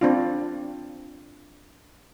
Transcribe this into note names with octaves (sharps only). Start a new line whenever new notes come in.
C4 D4 F4